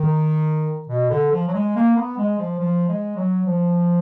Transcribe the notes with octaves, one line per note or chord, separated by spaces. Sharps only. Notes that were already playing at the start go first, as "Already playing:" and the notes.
Already playing: D#3
B2
D3
F3
F#3
G#3
A#3
B3
G#3
F3
F3
G#3
F#3
F3